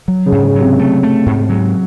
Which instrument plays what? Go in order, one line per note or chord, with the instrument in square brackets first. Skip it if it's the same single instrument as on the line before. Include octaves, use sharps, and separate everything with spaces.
[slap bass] F#3
[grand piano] C#3
[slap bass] G#2
[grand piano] C#3
[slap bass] F#3
[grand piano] C3
[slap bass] A3
A3
G#2
F#3